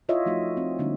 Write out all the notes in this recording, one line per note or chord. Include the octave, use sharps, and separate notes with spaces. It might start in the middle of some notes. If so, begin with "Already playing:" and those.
E4 F4 C#5 D#5 E5
F3 A3 D#4 F#4
C4
D3 G3 A#3 C4 D4 D#4